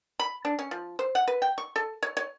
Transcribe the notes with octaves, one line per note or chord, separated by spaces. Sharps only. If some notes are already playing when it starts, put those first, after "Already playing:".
B5
D4
C#4
F3
C5
F#5
B4
G5
C#6
A4
C#5
C#5